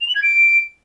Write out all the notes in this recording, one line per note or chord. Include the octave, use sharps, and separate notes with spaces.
F7
F#7
G#6
D7